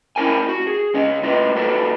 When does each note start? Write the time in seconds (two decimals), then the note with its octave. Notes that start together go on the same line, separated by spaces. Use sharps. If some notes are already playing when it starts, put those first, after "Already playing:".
0.16 C#4 E4 A#4 G5 G#5
0.49 F#4
0.67 G#4
0.94 C#3 C#4 D#5
1.23 A2 F4 B4 D#5
1.55 B1 G#2 F#4 A4 B4